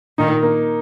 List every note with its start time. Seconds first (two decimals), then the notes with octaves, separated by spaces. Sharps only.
0.18 A#2 D#3 D#4
0.43 A#3